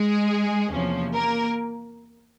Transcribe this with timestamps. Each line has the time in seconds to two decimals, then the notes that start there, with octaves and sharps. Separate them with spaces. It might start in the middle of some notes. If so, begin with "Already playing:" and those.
Already playing: G#3 G#4
0.70 E2 C3 F3 A#3 C#4
1.13 A#3 A#4